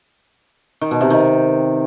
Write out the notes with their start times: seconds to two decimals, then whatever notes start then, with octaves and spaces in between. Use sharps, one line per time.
0.81 D#3
0.91 B2
1.01 C3
1.10 D#3